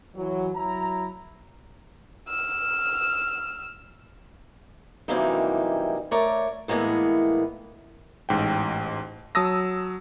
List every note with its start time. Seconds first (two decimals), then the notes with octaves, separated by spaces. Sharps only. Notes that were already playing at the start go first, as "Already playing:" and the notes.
0.16 E3 F#3
0.54 F#3 E4 C#5 A#5
2.29 E6 F6
5.08 F#2 C3 E3 G3 A#3 D#4
6.11 A3 A#4 C#5 D5
6.68 A2 E3 G#3 A#3 B3
8.29 A1 G#2 G5
9.35 F#3 A5 D#6 E6 A#6